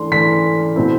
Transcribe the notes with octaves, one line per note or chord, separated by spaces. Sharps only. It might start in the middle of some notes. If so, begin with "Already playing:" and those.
Already playing: E3 A3 D4 C6
E3 A3 D4 B6
B2 A3 C4 E4